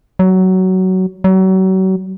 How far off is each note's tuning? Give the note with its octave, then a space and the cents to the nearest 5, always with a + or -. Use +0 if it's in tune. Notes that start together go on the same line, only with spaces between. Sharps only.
F#3 +15
F#3 +35